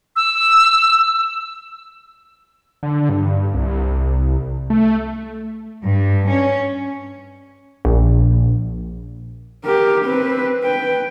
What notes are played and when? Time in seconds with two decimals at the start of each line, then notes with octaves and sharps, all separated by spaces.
0.16 E6
2.83 D3
3.09 G2
3.54 C2
4.70 A3
5.86 G2
6.29 C#4
7.85 A#1
9.64 G4 A#4
10.05 C4 B4
10.63 B4 G5